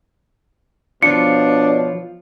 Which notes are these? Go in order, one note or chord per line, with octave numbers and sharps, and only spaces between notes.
B2 F3 D4 F4 C#5 C#7